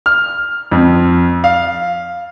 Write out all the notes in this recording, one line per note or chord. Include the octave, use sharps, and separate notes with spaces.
F6
F2
F5